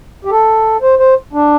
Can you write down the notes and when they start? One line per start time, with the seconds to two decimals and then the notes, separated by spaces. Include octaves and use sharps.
0.25 G4
0.31 A4
0.82 C5
0.99 C5
1.33 D4